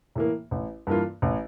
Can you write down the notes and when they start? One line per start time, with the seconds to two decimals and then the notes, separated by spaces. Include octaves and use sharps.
0.16 A2 E3 A#3
0.51 A1
0.87 G2 E3 A#3 F4
1.22 A1